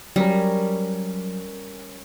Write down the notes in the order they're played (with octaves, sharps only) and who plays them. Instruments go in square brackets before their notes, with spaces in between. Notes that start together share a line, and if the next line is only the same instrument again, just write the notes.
[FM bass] F#3 [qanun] G3 [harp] C#4 A#4